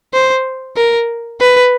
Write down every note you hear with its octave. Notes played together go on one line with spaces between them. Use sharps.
C5
A#4
B4